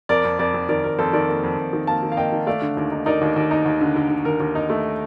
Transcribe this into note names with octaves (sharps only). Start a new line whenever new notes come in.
F2 A#4 D5
F2
F2 A#4 D5
F2
D#3 A#4 D5
F2 A#4
F2 A4 C5
D#3 A#4 D5
A#3
F2
F2
D#3
A#3 F5 A5
D#3
F5
A#3 D#5 G5
D#3
A3 D5 F5
D3
D#2
D#4
D#4 A#4 D5
D#2
D#2
D#4
D#2
D3
D3
D3
D#2 A#4
D#2
D#4
A3